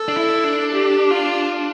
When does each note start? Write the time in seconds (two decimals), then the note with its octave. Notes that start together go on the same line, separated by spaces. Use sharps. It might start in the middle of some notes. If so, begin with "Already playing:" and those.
Already playing: A4
0.08 D4
0.17 E4
0.44 D4
0.71 G4
1.11 F4